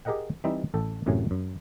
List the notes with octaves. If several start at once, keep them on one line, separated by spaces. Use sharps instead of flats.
G4 G#4 A#4 D#5 F#5 G5
E3 G3 C4 D#4 C5 E5
A1 A4 G5
A1 F#2 A2 C3 F#3 G#5
F#2